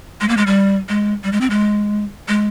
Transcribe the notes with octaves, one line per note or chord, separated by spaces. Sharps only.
G#3
A#3
G#3
G3
G#3
G3
G#3
C4
G#3
G#3